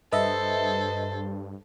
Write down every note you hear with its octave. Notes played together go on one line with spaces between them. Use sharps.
G2 A4 B4 C5 D#5 E5